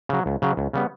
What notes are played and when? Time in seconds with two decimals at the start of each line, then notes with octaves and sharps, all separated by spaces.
0.09 C#3 F#3
0.26 C#2
0.42 C#3 F#3
0.57 C#2
0.73 C#3 G3 B3